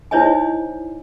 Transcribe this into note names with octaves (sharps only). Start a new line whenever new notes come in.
D#4 E4 C5 C#5 D#5 G#5